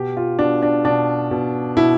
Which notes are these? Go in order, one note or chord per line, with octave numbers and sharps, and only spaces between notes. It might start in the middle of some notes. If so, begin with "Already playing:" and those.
Already playing: B2 G4
F4
B2 D4
D4
B2 D4
B2
B2 E4